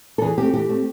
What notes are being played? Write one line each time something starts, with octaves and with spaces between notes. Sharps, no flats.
A4
E3 G#4
A3 C4 G4
E3 G4
A3 C4